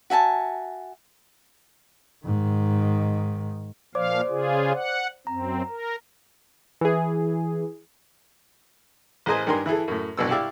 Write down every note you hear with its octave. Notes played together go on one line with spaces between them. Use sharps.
F#4 E5 G#5 A5
G#2 D#3
A#2 F3 C5 D5 F5 D6
C#3 F4 G#4
F#5
F#2 C4 A#5
A#4
E3 G#4
A1 G#4 A#4 C5 D#5 G#5
G2 D#3 G4 A#4 G#5 C6
E3 E4 G#4 A4
F#2 A2
C2 G2 B2 E6
E4 G4 D5 E5 F5